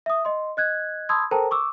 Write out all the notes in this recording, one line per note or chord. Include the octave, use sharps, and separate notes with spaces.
E5 D#6
D#5 C6
D#5 F#6 G#6
A5 B5 C6 D#6 E6 G#6
A4 A#4 C5 G5 A5 A#5
C#6 D6 E6